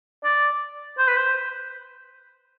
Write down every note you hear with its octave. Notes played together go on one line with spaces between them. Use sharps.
D5
C5
B4
C5